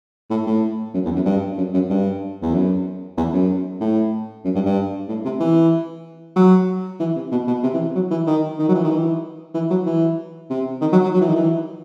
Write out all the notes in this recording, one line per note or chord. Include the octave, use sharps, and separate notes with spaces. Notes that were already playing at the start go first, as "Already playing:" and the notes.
A2
A2
F#2
E2
F#2
G2
F#2
F#2
G2
E2
F#2
E2
F#2
A2
F#2
G2
G2
A2
C3
E3
F#3
E3
C3
B2
B2
C3
E3
F#3
E3
D#3
D#3
F#3
E3
D#3
E3
E3
F#3
E3
C3
D#3
F#3
F#3
F#3
E3
D#3
E3